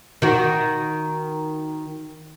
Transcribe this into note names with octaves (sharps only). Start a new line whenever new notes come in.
D#3 F#4